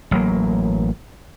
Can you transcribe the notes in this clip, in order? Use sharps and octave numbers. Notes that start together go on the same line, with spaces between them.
A1 F#3 A#3